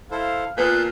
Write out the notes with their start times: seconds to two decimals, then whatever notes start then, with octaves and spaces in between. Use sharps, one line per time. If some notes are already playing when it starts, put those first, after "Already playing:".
0.11 E4 A4 C5 F5
0.58 A#2 B3 B4 A5 F#6 G6